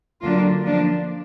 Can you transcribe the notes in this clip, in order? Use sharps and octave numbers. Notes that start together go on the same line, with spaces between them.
D3 F#3 A#3 D4 F4
F3 A#3 D4